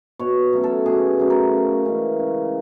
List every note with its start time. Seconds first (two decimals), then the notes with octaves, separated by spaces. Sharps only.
0.19 B2 C#5
0.53 F#3 A3 C#4
0.64 A4
0.86 B2 G#4
1.19 F#3 A3 C#4
1.30 A#4
1.53 C#3
1.85 E3 G#3 C#4
2.19 C#3